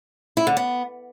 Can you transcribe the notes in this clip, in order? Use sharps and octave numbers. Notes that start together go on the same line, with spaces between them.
E4
D3
B3